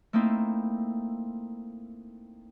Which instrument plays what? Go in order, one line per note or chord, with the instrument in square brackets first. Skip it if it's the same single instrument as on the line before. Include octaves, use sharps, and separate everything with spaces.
[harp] A3 A#3 C4 D#4 E4